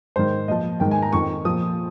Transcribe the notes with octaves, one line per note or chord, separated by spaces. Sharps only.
G#2 D#3 C5
A#2 F3 D#5
G#2 D#3 G5
G#5
A#5
F2 D#3 C#6
A#2 F3 D#6